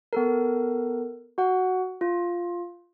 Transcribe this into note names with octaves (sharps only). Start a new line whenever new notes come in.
B3 A4 A#4
F#4 F#5
F4